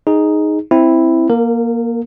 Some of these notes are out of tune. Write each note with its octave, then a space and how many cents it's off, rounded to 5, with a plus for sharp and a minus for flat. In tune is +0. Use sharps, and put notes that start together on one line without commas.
D#4 +0 G#4 +0
C4 +0 E4 +0
A#3 +15 A#4 -25